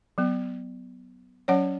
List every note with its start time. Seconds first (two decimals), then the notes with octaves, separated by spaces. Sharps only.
0.18 F#3 B3
1.48 F#3 C#4 C#5 F#5